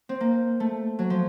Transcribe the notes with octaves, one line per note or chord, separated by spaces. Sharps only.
C4
A#3
A3
F#3
F3